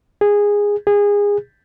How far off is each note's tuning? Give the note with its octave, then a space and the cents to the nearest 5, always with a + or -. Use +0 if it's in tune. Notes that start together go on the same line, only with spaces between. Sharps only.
G#4 -15
G#4 -25